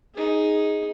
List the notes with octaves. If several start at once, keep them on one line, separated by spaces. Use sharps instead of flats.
D#4 G#4